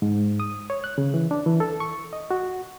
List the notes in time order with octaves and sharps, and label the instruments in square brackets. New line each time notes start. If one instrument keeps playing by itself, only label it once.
[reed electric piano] G#2
D#6
C#5
F#6
C#3
E3
D4
E3
A4
C#6
D#5
F#4